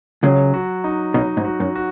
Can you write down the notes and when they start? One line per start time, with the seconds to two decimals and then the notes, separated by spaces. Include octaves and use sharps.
0.23 C#2 C#3 F#3
0.54 F#4
0.84 D#4
1.14 B1 B2 D#4
1.37 G#2
1.45 F#4
1.60 F#2
1.75 F#4